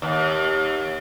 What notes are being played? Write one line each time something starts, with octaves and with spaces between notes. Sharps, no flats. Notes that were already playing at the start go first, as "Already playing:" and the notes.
D#2